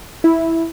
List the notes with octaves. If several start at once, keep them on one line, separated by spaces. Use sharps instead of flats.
E4